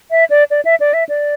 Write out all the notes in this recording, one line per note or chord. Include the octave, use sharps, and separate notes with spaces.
E5
D5
D5
E5
D5
E5
D5